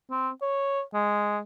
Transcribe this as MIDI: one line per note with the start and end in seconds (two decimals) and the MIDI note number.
0.11 0.30 60
0.42 0.82 73
0.94 1.40 56